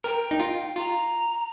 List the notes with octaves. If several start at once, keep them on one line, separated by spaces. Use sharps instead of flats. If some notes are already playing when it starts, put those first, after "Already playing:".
A#4 G5
D#4
F4
F4 A#5